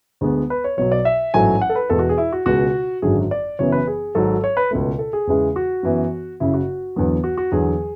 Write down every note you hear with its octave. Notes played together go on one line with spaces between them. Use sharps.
D2 D3 G#3 B3
B4
C#5
B1 B2 F#3 C#5
D5
E5
A1 G#2 F#3 A3 G#5
F#5
A4
B4
E2 B2 G#3 A4
F#4
G#4
E4
F#4
C#2 B2 G#3 F#4
G#1 F#2 D3 F#3 G#4
D5
F#1 F#2 C#3 E3 B3 C#5
B4
G#4
G#1 G#2 F#3 A4
C#5
B4
C#2 B2 A3
A4
G#4
E2 C#3 E3 G#3
F#4
F#2 E3 B3
F#1 F#2 C#3 E4
F#4
E2 D3 F#3 B3
F#4
F#4
E2 D3 F#3 G#4